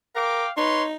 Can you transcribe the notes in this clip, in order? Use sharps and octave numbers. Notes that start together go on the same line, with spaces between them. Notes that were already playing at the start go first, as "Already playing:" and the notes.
A#4 F5 G5 D6
D#4 B4 C#5 C6